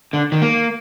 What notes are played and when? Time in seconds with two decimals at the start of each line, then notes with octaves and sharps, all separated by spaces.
0.13 D3
0.32 D#3
0.42 A#3